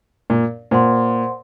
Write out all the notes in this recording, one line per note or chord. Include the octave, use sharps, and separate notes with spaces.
A#2
A#2 C5 F#5 C6